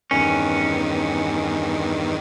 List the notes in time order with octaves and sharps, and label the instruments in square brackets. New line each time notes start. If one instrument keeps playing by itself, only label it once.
[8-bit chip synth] E2 G2 D#3 [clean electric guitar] C#4